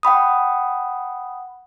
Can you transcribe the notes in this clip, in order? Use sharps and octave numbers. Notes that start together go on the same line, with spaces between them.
F#5 G5 B5 D#6